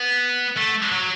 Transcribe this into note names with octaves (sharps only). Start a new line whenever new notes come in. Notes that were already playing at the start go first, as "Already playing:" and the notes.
Already playing: B3
A3
F#3